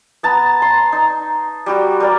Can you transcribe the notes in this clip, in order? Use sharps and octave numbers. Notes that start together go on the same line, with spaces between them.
B3 A5 A#5
C6
D#4
G3 F#4 G4
G3 A#4 D5